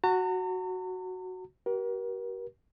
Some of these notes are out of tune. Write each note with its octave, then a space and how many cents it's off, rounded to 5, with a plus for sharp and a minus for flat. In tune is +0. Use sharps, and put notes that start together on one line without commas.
F#4 +0 A#5 -45
G4 -45 A#4 +40